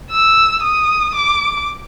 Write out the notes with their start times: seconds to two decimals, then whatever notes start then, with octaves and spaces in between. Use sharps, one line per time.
0.12 E6
0.63 D#6
1.15 D6